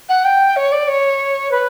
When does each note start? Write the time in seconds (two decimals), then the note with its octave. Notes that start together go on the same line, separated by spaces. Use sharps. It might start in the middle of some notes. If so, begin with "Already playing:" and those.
0.09 F#5
0.24 G5
0.56 C#5
0.72 D5
0.88 C#5
1.51 B4